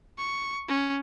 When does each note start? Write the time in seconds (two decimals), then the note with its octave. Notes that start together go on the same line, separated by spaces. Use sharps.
0.18 C#6
0.68 C#4